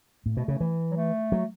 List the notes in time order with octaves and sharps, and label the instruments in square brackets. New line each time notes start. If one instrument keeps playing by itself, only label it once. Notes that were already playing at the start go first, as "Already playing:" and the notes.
[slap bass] A2 [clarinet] A3
[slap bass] B2
C#3
E3
[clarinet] F#3
A3
[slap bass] F#3